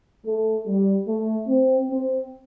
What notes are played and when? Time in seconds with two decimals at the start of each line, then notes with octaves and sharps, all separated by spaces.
0.25 A3
0.66 G3
1.07 A3
1.48 C4
1.90 C4